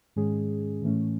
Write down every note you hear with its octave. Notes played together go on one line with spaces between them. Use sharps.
G#2 D#3 G#3 C#4 G#4
A2 E3 A3 C#4